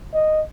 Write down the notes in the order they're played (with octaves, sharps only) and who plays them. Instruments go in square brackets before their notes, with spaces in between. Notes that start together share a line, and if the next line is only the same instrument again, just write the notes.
[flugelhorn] D#5